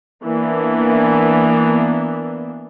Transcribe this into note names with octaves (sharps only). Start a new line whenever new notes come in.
E3 A#3 B3 D4